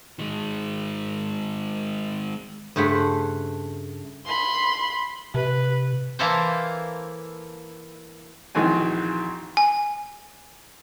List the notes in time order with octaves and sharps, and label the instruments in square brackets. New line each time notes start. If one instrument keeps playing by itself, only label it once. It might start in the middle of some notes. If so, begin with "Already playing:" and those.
[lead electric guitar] D#3 G#3
[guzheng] G2 C#3 A3 C5 F#5 B5
[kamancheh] B5 C6
[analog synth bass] C3 [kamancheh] B4
[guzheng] E3 A#3 E4 A4 A#4 C5
[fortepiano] A#1 D#3 E3 C4 F#4 G#5
[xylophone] G#5